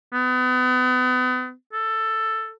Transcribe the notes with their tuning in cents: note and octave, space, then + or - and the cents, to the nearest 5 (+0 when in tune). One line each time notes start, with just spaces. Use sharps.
B3 +35
A4 +10